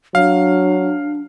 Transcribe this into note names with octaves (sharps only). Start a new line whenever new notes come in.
F#3 D4 F5